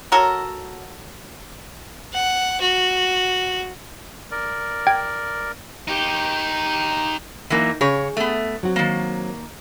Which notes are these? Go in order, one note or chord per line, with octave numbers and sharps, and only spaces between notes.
F#3 F#4 A4 A#4
F#5
F#4
A#4 D5
G5 G#6
D#4 G4
E3 F#3 A#3 D#4
C#3 G#4 C#5
A3 B3
F#3 C4 F#4
D#3 A#3